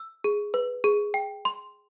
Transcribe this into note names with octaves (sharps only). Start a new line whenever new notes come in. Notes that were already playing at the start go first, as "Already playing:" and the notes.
Already playing: E6
G#4
B4
G#4
G5
C6